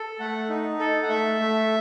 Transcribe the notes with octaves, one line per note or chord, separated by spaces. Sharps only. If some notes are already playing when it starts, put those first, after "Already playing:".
Already playing: A4
A3 F#5
D#4
A4
F#5
A3 E5
A3